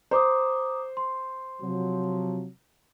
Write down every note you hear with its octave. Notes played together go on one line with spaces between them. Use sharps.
C5 A#5 D6 D#6
C6
C3 F3 F#3